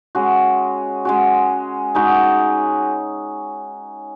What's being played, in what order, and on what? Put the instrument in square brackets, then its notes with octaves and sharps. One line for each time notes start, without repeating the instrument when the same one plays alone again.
[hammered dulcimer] G#3 C#4 F#4
G#3 C#4 F#4
G#3 D#4 F#4